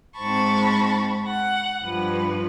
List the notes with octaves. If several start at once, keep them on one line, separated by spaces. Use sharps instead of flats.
G#2 C4 A5 B5 C#6
F#5
G2 F3 B4